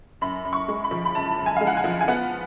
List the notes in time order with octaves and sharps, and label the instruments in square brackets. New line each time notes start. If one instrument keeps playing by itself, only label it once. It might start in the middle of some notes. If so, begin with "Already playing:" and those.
[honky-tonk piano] F#2 B5
F#2
C#6
G#3
B5
F3
B5
F#2 A5
F#2
G#5
G#3 F5
F#5
G#5
F3
G#5
B3 F#5